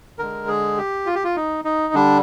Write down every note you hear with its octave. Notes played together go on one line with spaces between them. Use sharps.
D3 G#3 A#4
G#4
G4
F4
G4
F4
D#4
D#4
D3 G3 D4